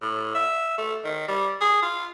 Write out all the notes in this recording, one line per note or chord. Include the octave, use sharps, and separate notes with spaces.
A2
E5
A3
D#3
G3
G#4
F4